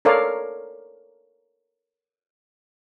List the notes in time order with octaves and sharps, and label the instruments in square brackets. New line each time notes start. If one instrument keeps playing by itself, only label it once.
[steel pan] A4 A#4 C#5 D5 F5